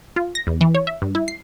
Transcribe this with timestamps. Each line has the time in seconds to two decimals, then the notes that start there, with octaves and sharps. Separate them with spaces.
0.16 F4
0.35 A#6
0.47 E2
0.61 E3
0.75 C#5
0.87 E5
1.02 G2
1.15 E4
1.28 C7